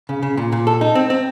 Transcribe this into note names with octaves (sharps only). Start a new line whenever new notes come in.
C#3
C#3
A#2
A#2
A4
D#4
C4
C4